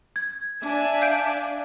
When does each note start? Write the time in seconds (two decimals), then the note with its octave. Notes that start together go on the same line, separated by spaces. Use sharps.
0.16 G#6
0.64 D4 E5 G#5
1.02 F5 G6 D7